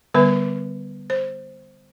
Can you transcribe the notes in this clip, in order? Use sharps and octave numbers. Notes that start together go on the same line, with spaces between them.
D3 G3 B3 B4
C5